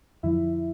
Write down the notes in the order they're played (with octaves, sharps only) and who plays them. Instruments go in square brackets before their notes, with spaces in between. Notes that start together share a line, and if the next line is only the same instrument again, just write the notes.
[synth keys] F2 D3 F3 E4 E5